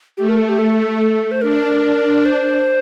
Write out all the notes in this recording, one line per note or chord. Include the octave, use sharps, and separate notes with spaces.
A3 G4
A#4
A4
G4
A4
C5
D4 A#4
C5